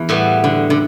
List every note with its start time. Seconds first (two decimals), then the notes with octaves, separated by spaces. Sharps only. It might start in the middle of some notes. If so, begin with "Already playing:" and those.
Already playing: E2 E3
0.09 A2 G3 B3
0.44 D3
0.70 D3